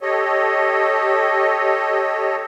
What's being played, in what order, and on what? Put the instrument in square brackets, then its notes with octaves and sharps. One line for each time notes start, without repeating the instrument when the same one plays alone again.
[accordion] G4 A4 C#5 D#5